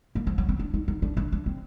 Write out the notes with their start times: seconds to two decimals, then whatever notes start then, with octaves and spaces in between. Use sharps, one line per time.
0.15 A#3
0.27 F3
0.38 F#3
0.49 C4
0.59 D4
0.74 D#4
0.88 D#4
1.02 D4
1.17 D4
1.32 D4
1.46 C4